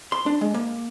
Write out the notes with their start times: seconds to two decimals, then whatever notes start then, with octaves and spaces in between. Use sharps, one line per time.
0.12 C6
0.26 D4
0.41 G#3
0.54 A#3